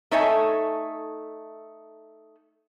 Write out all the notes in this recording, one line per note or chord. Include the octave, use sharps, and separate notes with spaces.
A3 D#4 A4 C#5 E5 G#5